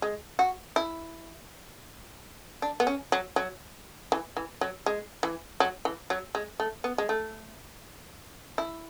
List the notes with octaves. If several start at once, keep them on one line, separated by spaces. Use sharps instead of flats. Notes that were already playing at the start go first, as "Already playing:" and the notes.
G#3
F#4
E4
D4
B3
C#4
F#3
F#3
E3
E3
F#3
G#3
E3
F#3
E3
F#3
G#3
A3
B3
G#3
A3
E4